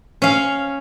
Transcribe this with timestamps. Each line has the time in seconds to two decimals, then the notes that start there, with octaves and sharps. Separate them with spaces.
0.22 C#4 F5